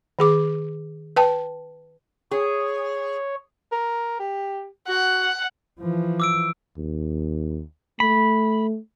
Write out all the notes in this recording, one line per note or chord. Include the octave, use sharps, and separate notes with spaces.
D#3 G#4 D6
B4 G5 A5
G#4 C#5
A#4
G4
F#4 F#5
E3 F3
D6 E6 D7
D#2
A3 B5